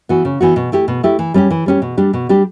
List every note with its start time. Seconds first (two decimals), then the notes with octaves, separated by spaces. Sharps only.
0.09 E3 B3 F#4
0.25 C#3
0.41 E3 B3 F#4
0.56 B2
0.72 A3 E4 G4
0.88 B2
1.03 A3 E4 G4
1.19 E3
1.34 G3 C#4 G4
1.50 E3
1.66 G3 C#4 G4
1.82 B2
1.97 G3 D4 G4
2.13 B2
2.29 G3 D4 G4